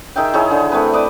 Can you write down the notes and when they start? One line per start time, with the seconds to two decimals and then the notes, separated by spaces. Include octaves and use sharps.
0.16 D#3 G#4 E5 G5
0.34 D#3 E4 G#4 C#5
0.51 D3
0.71 A3 C4 B4
0.93 B4 D5 D#5